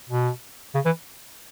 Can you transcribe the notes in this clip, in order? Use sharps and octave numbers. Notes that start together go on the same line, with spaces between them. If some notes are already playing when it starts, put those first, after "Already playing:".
B2
C#3
E3